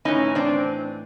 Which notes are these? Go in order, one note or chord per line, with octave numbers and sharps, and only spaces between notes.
A2 E3 C#4 D#4
C4 D4